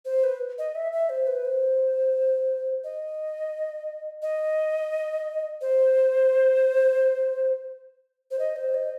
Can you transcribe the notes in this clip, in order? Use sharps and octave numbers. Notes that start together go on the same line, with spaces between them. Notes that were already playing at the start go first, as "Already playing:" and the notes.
C5
B4
D#5
E5
E5
C5
B4
C5
D#5
D#5
C5
C5
D#5
C5
D#5